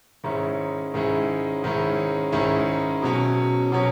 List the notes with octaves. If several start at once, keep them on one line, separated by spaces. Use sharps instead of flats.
G#2 D#3 G#3 C#4 E4
G#2 D#3 G#3 C#4 E4
G#2 D#3 G#3 C#4 E4
G#2 D#3 G#3 C#4 E4
B2 F#3 C#4
B2 F#3 C#4